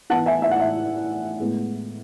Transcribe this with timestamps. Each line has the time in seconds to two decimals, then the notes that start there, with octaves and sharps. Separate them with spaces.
0.10 E3 B3 E4 F#5 A5
0.26 E5 G#5
0.42 E5
0.51 F#5
0.60 E5
1.39 A2 G#3 B3